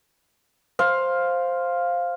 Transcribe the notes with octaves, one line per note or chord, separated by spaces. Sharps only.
C5 F5